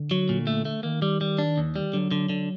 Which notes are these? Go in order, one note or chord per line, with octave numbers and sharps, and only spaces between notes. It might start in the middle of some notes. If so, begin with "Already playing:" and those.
Already playing: D3
F#3
A#2
A3
A3
D#3 A#3
G3
G3
D4
D#2
G3
D3 F#3
D3
D3